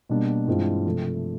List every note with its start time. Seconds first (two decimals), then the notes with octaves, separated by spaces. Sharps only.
0.09 B2 G3 A#3 D4
0.47 G2 E3 G#3 C4 F4
0.86 C3 F3 A3